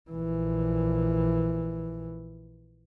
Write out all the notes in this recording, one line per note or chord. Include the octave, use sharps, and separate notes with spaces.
A#1 E3